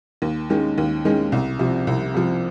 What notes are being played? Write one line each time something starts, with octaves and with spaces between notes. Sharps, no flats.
D#2
D#3 G#3 C#4
D#2
D#3 G#3 C#4
C2
C3 F3
C2
C3 F3